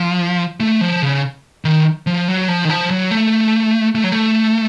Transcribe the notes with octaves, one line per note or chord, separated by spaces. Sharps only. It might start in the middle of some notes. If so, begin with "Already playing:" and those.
Already playing: F3
A3
F3
C#3
D#3
F3
F#3
F3
D#3
F3
F#3
A3
A3
F#3
A3